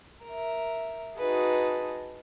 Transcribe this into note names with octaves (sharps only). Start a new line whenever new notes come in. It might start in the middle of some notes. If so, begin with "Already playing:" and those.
A#4 E5
D#4 F#4 G#4 B4 A5